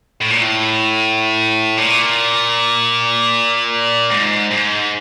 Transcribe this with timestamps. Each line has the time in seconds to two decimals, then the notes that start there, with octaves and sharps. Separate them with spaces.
0.21 A2
0.30 A#2
0.39 A2
1.77 A#2
4.11 G#2
4.51 G#2